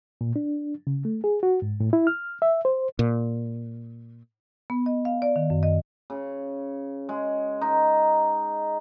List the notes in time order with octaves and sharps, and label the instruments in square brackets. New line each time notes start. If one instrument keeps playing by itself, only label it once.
[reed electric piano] A#2
D4
C#3
A3
G#4
F#4
G#2
A2
E4
F6
E5
C5
[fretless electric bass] A#2
[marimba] B3
D#5
F5
D5
D#3
F#2
D#5
[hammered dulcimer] C#3
G#3
D#4